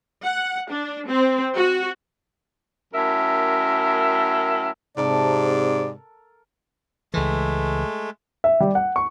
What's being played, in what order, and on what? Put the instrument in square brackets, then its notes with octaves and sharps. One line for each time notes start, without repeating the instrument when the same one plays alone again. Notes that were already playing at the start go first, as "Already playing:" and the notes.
[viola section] F#5
D4
C4
F#4
[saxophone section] F#2 A2 A#4 E5
[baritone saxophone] G#2 [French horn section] C3 [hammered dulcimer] A4 A#4 A#5 [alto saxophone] D5
[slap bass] C#2 E3 [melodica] G#3 A3
[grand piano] E5
G3
F#5
C#6